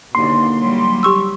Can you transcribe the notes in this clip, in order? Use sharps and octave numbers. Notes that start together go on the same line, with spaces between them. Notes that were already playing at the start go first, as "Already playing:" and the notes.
D#2 B2 D3 A#3 C6
F#3 G3
G4 C#6 E6